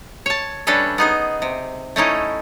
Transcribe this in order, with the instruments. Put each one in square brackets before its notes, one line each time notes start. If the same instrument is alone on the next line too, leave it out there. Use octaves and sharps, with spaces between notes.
[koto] C#5 A5
G3 C#4 D4 A4 B4 E5
B3 D#4 G#4
C3
A3 C#4 D#4 E4